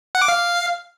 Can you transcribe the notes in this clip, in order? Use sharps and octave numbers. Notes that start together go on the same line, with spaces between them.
F#5
D6
F5